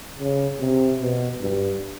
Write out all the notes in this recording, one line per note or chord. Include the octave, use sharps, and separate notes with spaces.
C#3
C3
B2
G2